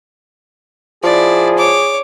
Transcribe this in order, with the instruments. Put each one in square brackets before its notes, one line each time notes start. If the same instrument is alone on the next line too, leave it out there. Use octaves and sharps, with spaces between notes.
[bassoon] F3 [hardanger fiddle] E4 D5 [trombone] G#4
[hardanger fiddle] C#5 D6